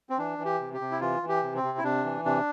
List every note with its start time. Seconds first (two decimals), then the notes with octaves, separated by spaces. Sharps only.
0.10 C4
0.18 E3 D4
0.39 E3
0.45 G4
0.60 C3
0.74 G4
0.81 C3
0.92 E4
1.01 E3 F4
1.22 E3
1.29 G4
1.43 C3
1.56 C4
1.63 C3
1.78 E4
1.83 C3 D4
2.04 E3
2.25 C3 D4